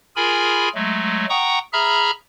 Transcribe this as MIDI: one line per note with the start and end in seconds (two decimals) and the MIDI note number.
0.16 0.69 65
0.16 0.69 68
0.16 0.69 70
0.16 0.69 80
0.16 0.69 83
0.75 1.26 54
0.75 1.26 56
0.75 1.26 57
1.29 1.59 78
1.29 1.59 79
1.29 1.59 82
1.29 1.59 85
1.29 1.59 87
1.73 2.11 68
1.73 2.11 76
1.73 2.11 82
1.73 2.11 83
1.73 2.11 89